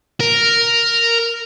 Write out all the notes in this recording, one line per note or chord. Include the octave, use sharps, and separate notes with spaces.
A#4